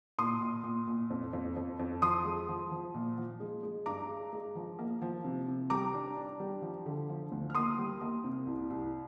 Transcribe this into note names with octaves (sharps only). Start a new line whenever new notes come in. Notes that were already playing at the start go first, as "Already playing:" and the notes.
A#2 C6 D#6
A#2
A#2
A#2
F2
F2
F2
F2
F3 C6 D#6
G#3
F3
F3
A#2
F3
G#3
G#3
G2 A#5 D6
G#3
G#3
F3
A#3
F3
C3
C3
G3 A#5 D6
D4
D4
G3
F3
D3
F3
D2
F6
A#3 C6 D#6
G3
A#3
C3
C2
C2